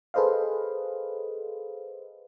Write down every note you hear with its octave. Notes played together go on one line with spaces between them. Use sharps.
G#4 A4 B4 C5 D#5 F5